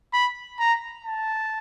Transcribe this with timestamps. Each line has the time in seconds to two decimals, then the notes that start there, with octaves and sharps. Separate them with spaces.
0.13 B5
0.59 A#5
1.05 A5